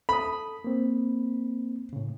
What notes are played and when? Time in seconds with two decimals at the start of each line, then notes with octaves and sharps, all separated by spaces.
0.09 A4 B5 D#6
0.64 A#3 C4
1.93 A2 C#3